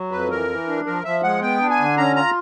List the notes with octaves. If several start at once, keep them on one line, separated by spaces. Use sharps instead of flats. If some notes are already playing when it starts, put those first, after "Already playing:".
Already playing: F#3
F2 B4
E3 A#4
E3
D4
F3 A#4
F3 E5
G#3 F#5
B3 G5
D4
G#5
D3
C#4 A#5
F4 A#5